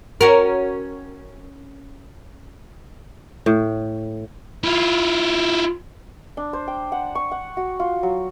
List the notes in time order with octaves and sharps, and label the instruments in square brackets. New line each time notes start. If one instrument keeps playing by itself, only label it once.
[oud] C#4 F#4 A#4
[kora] A2
[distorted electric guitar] E4 F4
[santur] D4
C5
G5
F#5
C#6
F#5
F#4
F4
F#3